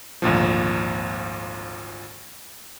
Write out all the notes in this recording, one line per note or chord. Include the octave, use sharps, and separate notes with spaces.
G#1 D2 A#2 F3